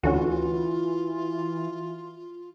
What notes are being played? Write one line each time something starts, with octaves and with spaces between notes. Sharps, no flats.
D2 D3 E3 C#4 F4 F#4